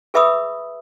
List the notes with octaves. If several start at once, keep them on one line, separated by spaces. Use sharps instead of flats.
G#4 B4 E5 B5 D#6 E6